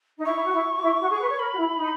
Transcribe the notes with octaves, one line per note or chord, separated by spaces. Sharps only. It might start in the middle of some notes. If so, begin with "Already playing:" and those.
D#4
E4 C#6
E4
F#4
E4
F#4
E4
F#4
G#4
B4
C#5
A#4 B5
F#4
E4
D#4